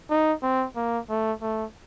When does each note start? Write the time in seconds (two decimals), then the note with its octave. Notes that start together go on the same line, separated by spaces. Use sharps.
0.10 D#4
0.43 C4
0.76 A#3
1.09 A3
1.42 A3